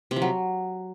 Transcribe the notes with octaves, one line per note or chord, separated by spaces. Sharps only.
C3
F3
F#3